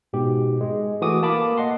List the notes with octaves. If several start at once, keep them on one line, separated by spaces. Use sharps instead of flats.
G#2 B2 G4
G#3
E3 A3 F#4 A4 D6 D#6
A#3 A5 B5 D6
D#5 F#5 C6